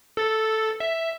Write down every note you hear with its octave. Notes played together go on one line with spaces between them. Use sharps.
A4 A6
E5